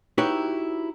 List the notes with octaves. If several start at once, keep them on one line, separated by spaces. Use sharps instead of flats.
D#4 E4 F#4 G4 B4 C#5